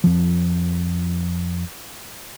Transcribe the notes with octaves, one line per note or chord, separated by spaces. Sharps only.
F2 F3